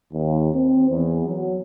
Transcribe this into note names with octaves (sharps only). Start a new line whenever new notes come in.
D#2
C4
E2
F#3